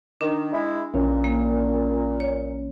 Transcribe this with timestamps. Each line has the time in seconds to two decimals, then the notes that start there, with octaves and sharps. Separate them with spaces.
0.21 D#3 D4
0.53 G#3 E4
0.94 A#1 A#2 E3 C#4
1.24 A#3
2.20 C#5